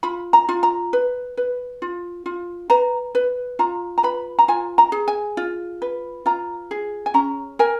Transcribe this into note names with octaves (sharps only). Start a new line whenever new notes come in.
F4 B5
A#5
F4
A#5
B4
B4
F4
F4
B4 A#5
B4
F4 A#5
A#5
B4 B5
A#5
F4 G#5
A#5
G#4
G#5
F4
B4
F4 A#5
G#4
G#5
C#4 A#5
A#4 G#5